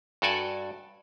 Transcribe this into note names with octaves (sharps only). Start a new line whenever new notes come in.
G2 F#4 A4 D5 G#5